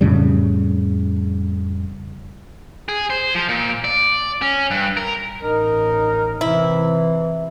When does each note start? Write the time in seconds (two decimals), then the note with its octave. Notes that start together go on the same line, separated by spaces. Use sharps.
0.01 F2 A2 C#3 G3
2.88 G#4
3.10 C5
3.35 F3
3.49 A#2
3.84 D5
4.42 C#4
4.71 G2
4.97 A#4
5.42 A1 D#4 A#4
6.41 C3 E3 E4